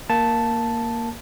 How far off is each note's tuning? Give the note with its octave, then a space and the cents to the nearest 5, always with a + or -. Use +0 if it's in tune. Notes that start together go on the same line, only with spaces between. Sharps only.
A#3 +0 A5 +0